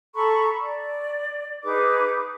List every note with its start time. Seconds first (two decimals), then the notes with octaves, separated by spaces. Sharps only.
0.15 A4 A#5 B5 C#6
0.62 D5
1.63 D#4 G#4 B4 D6